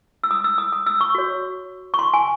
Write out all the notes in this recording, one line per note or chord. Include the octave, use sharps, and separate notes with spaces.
E6
D#6
E6
D#6
D#6
E6
C#6
F#4 C#5
C#6
C6
G#5